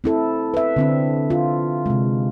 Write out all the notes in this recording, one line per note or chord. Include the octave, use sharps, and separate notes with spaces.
C4 E4 A4
B4 E5
D3 C4 D4
F4
C3 G#3